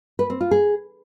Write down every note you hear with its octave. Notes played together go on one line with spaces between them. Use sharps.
B4
C4
F4
G#4